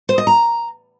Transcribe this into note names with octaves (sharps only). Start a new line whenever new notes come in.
C5
D#5
A#5